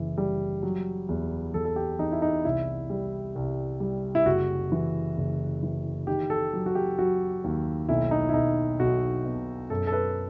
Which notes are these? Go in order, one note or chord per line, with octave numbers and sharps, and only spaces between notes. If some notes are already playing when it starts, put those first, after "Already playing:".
Already playing: F#1 E3
G3
F#3
E2
E2 A4
A4
G4
E2 D#4
E4
D#4
C2 E4
G3
C2
G3
E4
F#1 F#4
E3
F#1
E3
D#3 G4
A4
F#3
F#4
G4
F#3 F#4
D#2
B1 E4
D#4
E4
B1 D#4
B1 F#4
B2
F#2 A4
A4
B4